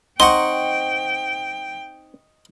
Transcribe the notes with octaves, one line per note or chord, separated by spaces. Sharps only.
C4 D#4 D#5 F#5 G5 C6 C#6